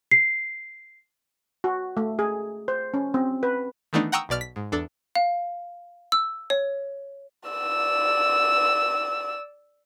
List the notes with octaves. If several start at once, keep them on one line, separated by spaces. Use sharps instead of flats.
C7
F#4
A3
G#4
C5
C#4
C4
B4
D#3 E3 A3 B3 D4 D#4
F#5 G5 A#5 C#6 D#6 E6
B1 B2 D5 F6
B6
G#2
E2 D4 A4
F5
E6
C#5
D5 E6